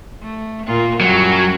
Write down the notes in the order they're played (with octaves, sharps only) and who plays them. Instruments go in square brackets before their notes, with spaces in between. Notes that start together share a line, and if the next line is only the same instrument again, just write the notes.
[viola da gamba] A3
A#2 A#3 F4
[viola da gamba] F#2 G3 C#4 [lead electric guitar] F#3